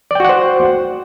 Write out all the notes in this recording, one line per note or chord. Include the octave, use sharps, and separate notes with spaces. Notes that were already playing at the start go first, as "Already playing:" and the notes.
F#4 C5 D5 F#5 G5